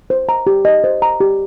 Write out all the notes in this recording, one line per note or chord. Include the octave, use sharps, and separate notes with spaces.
C5
A#5
G4
D#5
C5
A#5
G4